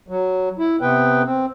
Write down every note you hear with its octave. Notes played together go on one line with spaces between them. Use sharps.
F#3
E4
C3 B3 B4 G5
C4